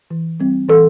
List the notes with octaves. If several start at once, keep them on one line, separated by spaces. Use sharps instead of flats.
E3
G3 C4
E3 A4